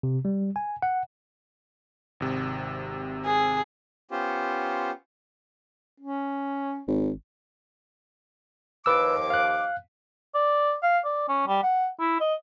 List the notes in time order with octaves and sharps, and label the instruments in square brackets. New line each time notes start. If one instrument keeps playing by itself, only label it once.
[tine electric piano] C3
G3
G#5
F#5
[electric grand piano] G#1 C3
[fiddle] G#4
[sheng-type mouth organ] B3 C#4 F4 G4 C5
[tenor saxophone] C#4
[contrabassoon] G#1
[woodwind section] D#2 F3 D6 [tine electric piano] B4 E6
[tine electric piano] F5 F#6
[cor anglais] D5
F5
D5
C#4
G3
F#5
E4
D#5